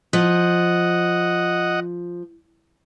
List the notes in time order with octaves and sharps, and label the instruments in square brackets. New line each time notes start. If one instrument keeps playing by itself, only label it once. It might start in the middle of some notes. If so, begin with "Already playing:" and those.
[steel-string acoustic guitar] F3 [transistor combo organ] D#5 F#5